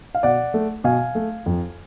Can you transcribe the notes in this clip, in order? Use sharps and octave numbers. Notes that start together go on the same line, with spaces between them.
F5
B2 D5 F#5
A3
B2 F5 G#5
A3
F2